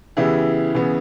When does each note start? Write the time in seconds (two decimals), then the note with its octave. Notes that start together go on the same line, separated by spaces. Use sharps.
0.17 C#3 E3 B3 E4 G4
0.74 C#3 E3 B3